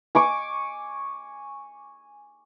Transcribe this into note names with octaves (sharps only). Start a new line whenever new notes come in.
G#5 C#6 D6